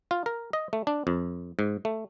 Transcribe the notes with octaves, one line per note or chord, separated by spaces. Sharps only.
F4
A#4
D#5
A3
D4
F2
G#2
A3